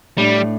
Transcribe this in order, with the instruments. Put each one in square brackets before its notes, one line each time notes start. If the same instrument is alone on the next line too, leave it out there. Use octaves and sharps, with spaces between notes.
[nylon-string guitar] A2 A3 D4 [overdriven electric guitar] G3